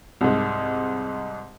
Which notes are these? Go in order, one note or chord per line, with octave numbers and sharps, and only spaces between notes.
C2 G#2